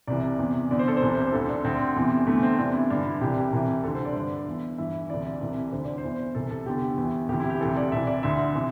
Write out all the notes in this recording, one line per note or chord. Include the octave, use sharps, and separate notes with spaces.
C2 C3 E3 D5
E2 C3 E3
E2 D3 D5
C5
A4
C5
C2 C3 E3
C5
D2 D3 A4
D4
D2 D3 C4
E2 C3 E3
E2 D3 A3
C4
E2 C3 E3 D4
E4
G2 D3 D4
E4
C2 C3 E3 G4
C2 C3 E3
D2 D3 A4
C5
D5
G2 D3
E2 E3
G2 E3 E5
D2 C3 E3 D5
C2 C3 E3
D2 D3 C5
D5
C5
E2 E3
C2 C3 E3 A4
A4
E2 D3 G4
E2
E3
D2 C3 E3 G4
E4
G4
D2 C3 E3 A4
D5
C2 C3 E3 E5
D5
D2 D3 E5
C3 E3